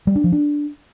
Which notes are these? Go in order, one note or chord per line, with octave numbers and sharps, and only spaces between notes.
G3
D4
F3
D4